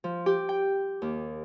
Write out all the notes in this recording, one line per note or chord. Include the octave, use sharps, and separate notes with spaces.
F3
G4
G5
D#2